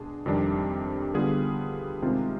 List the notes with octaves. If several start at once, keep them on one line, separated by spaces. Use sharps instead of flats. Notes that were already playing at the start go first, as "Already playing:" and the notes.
Already playing: B2 G#3 D4 G#4
F2 C3 D#3 G3 D4
D3 G3 B3 F4 G#4
C3 D#3 G#3 C4 F4